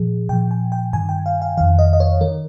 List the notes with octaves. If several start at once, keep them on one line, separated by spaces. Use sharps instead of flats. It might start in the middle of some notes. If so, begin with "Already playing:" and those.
Already playing: A#2 F3 G#4
A#2 F3 G5
G#5
G5
G2 D#3 G#5
G5
F5
F5
F2 D#3 F5
D#5
D#5
C#5
D#3 A#4